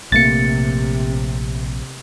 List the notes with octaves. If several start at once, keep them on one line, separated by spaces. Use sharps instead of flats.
A#1 C3 A3 A#3 A6 C#7